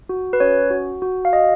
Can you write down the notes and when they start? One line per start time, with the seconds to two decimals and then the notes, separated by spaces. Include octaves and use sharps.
0.09 F#4
0.33 B4
0.40 C#4 C#5
0.70 F#4
1.02 F#4
1.25 F5
1.33 F#4 D#5